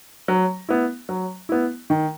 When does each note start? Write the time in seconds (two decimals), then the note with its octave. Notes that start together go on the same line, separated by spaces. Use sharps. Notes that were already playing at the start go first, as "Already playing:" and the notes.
0.28 F#3
0.69 B3 E4
1.09 F#3
1.49 B3 E4
1.90 D#3